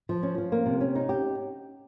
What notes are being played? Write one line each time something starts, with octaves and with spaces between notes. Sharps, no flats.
F3
C#4
F3
A#3
C3
C#4
D#4
G4